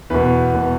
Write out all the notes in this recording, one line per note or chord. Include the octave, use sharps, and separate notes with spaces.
E2 B2 B4
B2